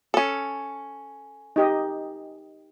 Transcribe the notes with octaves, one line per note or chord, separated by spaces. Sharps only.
C#4 A4
D#4 G4 D#5